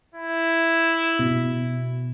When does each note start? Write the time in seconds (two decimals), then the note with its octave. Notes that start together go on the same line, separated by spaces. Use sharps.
0.14 E4
1.19 B2